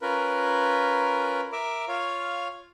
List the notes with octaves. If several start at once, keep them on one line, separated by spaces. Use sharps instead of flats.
C#4 F4 A#4 B4
A#4 E5 D6
F4 C#5 F5